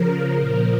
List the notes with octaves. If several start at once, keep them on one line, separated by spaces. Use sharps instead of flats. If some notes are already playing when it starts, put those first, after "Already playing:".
Already playing: C#3 F3 A#4
A#2 F3